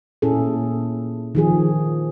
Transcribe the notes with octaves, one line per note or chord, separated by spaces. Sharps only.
A#2 C#4 E4 G#4 A4
D#3 F3 G#4